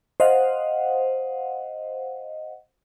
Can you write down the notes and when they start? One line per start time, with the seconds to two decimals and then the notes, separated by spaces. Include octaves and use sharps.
0.20 C5 D#5 F5 F#5